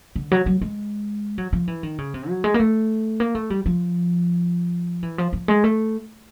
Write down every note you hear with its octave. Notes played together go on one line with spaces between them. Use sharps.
D3
F#3
F#3
G#3
F#3
F3
E3
D#3
C#3
C3
F#3
G#3
A#3
A3
A#3
A3
G3
F3
E3
F3
F3
G#3
A3